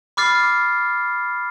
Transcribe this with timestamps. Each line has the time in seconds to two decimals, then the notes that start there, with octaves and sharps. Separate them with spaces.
0.17 B5 D6 F6 A6 C7